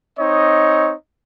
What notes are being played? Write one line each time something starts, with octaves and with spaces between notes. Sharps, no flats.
C4 D#4 C#5 D#5